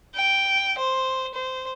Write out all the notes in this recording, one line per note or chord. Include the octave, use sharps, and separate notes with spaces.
G5
C5
C5